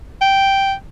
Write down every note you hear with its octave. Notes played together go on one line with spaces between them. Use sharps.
G5